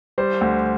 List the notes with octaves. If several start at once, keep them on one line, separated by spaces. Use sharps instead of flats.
G3 C5
D2